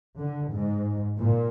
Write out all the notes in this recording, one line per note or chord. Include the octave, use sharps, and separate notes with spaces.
D3
G#2
A#2